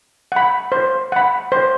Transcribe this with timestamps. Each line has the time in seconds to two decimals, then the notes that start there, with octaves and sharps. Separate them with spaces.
0.32 F#5 B5
0.72 C5
1.12 F#5 B5
1.52 C5